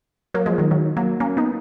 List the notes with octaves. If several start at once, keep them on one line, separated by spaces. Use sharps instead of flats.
F#3 A#3
F3 G#3
D#3 F#3
D#3 F#3
F#3 A#3
A#3 C#4
B3 D#4